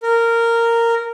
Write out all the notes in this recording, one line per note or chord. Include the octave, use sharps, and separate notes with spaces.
A#4